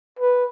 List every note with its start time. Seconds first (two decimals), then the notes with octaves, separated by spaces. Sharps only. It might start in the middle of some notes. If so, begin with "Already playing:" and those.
0.20 B4